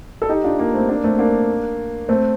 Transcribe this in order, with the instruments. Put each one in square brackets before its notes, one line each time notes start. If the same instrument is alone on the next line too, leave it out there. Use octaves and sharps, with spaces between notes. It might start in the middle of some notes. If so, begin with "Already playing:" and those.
[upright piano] A4
D#4 G4
D4 F4
A#3 D4
A3 C4
A#3 D4
A3 C4
A#3 D4
A3 C4